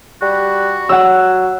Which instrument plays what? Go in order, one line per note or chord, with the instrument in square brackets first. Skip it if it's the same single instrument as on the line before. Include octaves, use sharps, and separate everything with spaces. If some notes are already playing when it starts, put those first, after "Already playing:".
[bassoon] G3 [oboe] F#4
[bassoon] F#3 [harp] F#5 E6